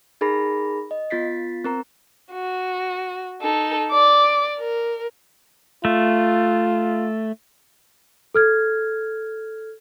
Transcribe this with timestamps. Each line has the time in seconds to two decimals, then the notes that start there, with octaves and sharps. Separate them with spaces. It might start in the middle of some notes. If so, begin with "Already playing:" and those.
0.21 D#4 G#4 A#4 B5 A#6
0.91 D#5
1.10 B3 F4 A6 B6 C7
1.64 C4 A#4 A#5
2.32 F#4
3.42 D#4 A4
3.91 D5 D6
4.58 A#4
5.85 A3 F4
8.34 A4 F6 G#6